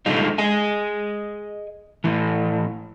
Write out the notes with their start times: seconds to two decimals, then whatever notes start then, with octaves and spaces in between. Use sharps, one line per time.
0.06 D3 G3 G#3 D#4 F4
0.38 G#4 D#5 G#5
2.04 A2 E3